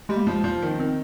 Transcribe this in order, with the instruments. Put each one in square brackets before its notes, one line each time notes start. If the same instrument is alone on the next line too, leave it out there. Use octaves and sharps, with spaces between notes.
[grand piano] G3 [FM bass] G#3
[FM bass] A#3
[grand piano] F3 [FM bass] G#3
[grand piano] F3 [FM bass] A#3
[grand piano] D#3
[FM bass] C#4
[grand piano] D#3 [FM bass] C4